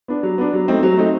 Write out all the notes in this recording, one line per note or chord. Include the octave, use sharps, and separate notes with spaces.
B3 D4
F#3
B3 D4
F#3
A3 C4 D#4
F#3
A3 C4 D#4